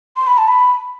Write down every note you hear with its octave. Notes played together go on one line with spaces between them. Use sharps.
C6
B5
A5
B5